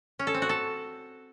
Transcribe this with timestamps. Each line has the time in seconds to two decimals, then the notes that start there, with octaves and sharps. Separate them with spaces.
0.19 C#4
0.27 A4
0.34 C4
0.42 F#4
0.49 A4